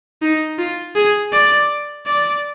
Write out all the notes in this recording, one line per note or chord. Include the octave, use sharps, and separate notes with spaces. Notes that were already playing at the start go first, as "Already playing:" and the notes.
D#4
F4
G#4
D5
D5